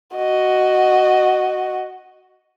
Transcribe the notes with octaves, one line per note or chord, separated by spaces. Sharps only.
F#4 D#5